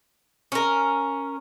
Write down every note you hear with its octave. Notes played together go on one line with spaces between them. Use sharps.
C#4 A#4